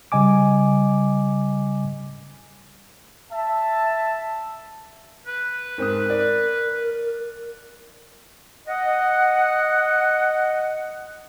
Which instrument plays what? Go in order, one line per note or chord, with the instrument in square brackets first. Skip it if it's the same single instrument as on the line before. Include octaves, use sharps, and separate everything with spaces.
[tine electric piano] C#3 G3 D#5 G#5 D6
[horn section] E5 A5
[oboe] B4
[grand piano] G#2 C4 D#6 [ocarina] A#4
[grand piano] D5
[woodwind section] D#5 F#5